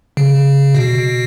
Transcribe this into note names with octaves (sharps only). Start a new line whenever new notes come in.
C#3
B2